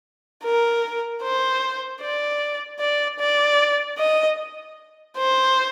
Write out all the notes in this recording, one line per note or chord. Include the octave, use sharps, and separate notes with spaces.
A#4
C5
D5
D5
D5
D#5
C5